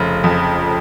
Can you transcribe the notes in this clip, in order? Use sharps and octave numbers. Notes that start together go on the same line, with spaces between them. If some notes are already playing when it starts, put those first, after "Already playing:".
Already playing: F1 C#3
F2